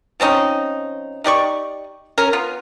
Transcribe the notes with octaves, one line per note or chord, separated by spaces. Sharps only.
F3 C4 C#4 D#4
D#4 G4 D5 C#6
C#4 A#4
B3 F4